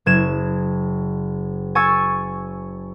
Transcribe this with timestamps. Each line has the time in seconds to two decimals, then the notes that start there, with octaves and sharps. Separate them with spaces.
0.06 F#1 G#6 E7
1.75 G#5 C#6 E6 A6